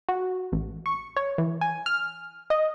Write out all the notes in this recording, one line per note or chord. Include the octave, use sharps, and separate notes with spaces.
F#4
A1
C#6
C#5
E3
G#5
F6
D#5